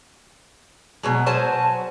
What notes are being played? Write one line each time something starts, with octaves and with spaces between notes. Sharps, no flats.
B2 F#3 G#3
F#3 C5 G#5 A5